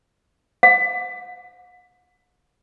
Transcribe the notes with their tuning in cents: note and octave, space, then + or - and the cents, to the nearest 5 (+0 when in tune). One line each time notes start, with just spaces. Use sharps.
F#5 -45